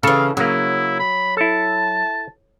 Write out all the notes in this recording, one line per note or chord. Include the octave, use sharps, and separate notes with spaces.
C#3 E3 A4 F5 A5
C#3 F#3 A#3 E4
B5
E4 A4 A5